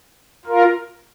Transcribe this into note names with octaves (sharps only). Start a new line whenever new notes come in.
F4 A#4